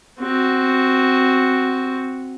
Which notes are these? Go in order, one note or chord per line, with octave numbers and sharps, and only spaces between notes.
C4 F#4